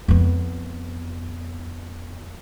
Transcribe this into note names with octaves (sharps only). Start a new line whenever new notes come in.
F2 B3